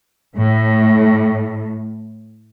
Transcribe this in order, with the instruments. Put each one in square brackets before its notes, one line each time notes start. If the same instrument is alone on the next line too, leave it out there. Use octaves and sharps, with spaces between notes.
[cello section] A2